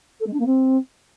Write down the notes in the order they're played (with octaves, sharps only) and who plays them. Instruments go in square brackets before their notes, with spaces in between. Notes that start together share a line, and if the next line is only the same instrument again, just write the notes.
[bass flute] A4
G#3
D4
A#3
C4